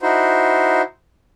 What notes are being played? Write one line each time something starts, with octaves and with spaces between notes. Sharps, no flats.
D#4 E4 F#4 C5